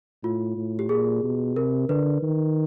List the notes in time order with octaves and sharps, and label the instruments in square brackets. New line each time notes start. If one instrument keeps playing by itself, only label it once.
[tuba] A2 [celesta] F4
[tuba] A2
[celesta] G4
[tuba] A#2 [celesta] G#4
[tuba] B2
[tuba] C3 [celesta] A#4
[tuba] D3 [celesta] B4
[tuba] D#3